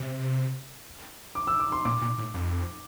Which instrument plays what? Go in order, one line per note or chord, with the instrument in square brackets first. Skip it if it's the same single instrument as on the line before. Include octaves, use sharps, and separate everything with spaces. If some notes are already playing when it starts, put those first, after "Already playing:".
Already playing: [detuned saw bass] C3
[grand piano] D6
E6
D6
C6
[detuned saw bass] A#2 [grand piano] D6
[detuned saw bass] A#2
A2
F2